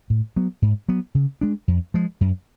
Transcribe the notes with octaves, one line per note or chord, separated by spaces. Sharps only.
A2
F#3 B3
G#2
F#3 B3
C#3
G#3 D4
F2
F3 G#3
F#2